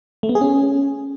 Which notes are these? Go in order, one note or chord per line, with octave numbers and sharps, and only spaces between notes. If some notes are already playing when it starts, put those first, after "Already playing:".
A3
B3
G#4
C#4